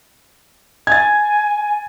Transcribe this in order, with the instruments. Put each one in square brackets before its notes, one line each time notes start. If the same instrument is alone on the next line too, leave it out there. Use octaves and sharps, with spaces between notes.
[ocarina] G#5 [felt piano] G#6 A6